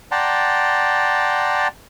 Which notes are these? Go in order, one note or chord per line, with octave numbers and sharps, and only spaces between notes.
D5 F#5 G5 A5 A#5 C6